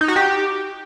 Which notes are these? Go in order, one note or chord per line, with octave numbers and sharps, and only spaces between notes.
D#4
F#4
G4